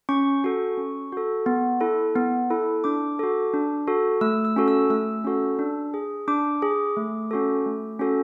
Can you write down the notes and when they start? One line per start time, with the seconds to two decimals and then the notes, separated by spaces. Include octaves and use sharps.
0.09 C#4 C#6
0.44 F#4 A4
0.77 C#4
1.12 F#4 A4
1.46 B3
1.81 E4 A4
2.16 B3
2.50 E4 A4
2.84 D4 D6
3.19 F#4 A4
3.54 D4
3.87 F#4 A4
4.21 A3 E6
4.45 E6
4.56 C#4 F#4 A4
4.68 E6
4.90 A3 E6
5.24 C#4 F#4 A4
5.59 D4
5.94 G#4
6.28 D4 D6
6.62 G#4
6.97 A3
7.31 C#4 F#4 A4
7.66 A3
7.99 C#4 F#4 A4